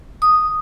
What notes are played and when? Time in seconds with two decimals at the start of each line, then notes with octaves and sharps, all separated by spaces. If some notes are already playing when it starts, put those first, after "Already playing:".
0.22 D#6